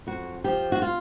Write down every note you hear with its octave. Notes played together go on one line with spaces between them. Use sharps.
F2 F#4
F3 G4
F#4
F4